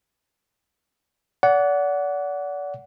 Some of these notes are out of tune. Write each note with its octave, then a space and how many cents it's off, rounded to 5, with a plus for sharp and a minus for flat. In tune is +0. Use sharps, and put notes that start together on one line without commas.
D5 -35 F#5 +0